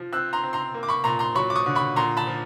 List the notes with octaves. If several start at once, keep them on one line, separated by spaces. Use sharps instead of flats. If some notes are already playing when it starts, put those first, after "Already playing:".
Already playing: F3
C4 E6 F#6
A#5 C6
C4
A#5 C6
A#3
D6
B5 C#6
A#2 A#5 C6
A#5 C6
F#3 B5 C#6
D6
C#6 D#6
D3
B5 C#6
A#2 A#5 C6
A5 B5
F3